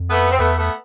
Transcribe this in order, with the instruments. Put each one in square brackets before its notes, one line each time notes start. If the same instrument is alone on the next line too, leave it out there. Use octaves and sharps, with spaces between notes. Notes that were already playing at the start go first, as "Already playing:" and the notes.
Already playing: [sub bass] F2
[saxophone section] A3 B3
C4
[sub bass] E2 [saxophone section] A3 B3
[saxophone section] A3 B3